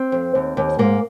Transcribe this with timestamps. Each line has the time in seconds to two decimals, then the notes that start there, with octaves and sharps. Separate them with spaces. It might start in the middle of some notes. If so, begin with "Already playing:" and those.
Already playing: C4
0.12 F2
0.35 D#2
0.57 D#2
0.79 G#2 A#3